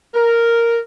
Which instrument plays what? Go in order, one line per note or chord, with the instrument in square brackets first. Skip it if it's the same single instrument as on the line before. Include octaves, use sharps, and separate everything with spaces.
[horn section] A#4